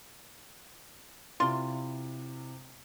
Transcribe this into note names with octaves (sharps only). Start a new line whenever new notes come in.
C3 E4 F4 D5 C6